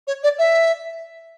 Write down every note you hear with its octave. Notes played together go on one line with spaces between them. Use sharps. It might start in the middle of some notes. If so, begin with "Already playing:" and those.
C#5
D5
E5